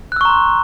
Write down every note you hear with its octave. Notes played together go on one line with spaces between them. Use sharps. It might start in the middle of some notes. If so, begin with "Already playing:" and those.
A#5 C6 C#6 E6 F#6